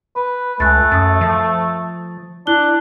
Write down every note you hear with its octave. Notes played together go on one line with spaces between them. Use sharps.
B4 B5
C#2 A3 G#5 F#6 A6
F#2 D#6 A6
F3
D4 E4 F#6 G7